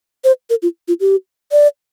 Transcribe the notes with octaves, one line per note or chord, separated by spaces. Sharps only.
C5
A#4
F4
F4
G4
D5